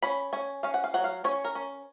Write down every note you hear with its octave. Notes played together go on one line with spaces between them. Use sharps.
C#4 B5
C#4 G#5
C#4 F5
F#5
F5
F#3 F#5
F5
C#4 C#5
A#4
C#4